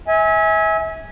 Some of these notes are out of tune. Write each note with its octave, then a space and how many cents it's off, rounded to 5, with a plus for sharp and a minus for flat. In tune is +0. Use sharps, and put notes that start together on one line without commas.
E5 -35 G#5 +0